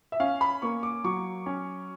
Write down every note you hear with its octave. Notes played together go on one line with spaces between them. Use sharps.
E5
C#4 F5
B5
A#3 C#6
D6
F#3 C#6
C#4